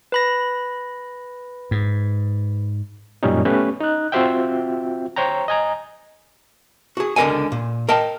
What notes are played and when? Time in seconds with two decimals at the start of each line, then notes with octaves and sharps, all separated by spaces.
0.12 B4 B5 A#6
1.71 G#2
3.23 F#2 A#2 G3 C#4 D#4
3.45 A3 B3 C#4 G4 B4
3.81 D#4 F#6
4.12 C4 F4 F#4 C5 E5 G5
5.16 C5 C#5 G5 A#5
5.48 D#5 G#5 A#5
6.97 F#4 G#4
7.16 C#2 D3 A#4 D#5 G#5
7.52 A#2
7.89 A#4 D#5 G5 A5